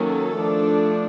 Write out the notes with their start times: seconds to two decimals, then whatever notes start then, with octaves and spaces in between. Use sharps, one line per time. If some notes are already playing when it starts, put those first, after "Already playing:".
Already playing: D#3 F#3 A#3 C#4 A4
0.38 F3 A3 D4